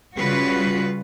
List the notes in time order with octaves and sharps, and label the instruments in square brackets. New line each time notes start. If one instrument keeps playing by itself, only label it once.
[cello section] C#3 G3 F4 F#4 B4